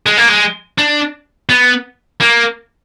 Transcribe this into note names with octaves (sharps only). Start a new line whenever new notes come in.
G#3
A#3
G#3
D4
B3
A#3